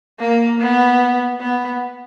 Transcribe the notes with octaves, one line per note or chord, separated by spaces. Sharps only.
A#3
B3
B3